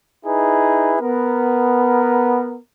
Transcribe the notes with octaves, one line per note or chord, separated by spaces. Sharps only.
D#4 E4 G#4 B4
B3 A#4